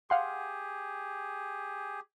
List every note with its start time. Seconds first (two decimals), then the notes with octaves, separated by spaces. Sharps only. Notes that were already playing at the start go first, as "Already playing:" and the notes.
0.10 G4 G#4 F5 F#5 C6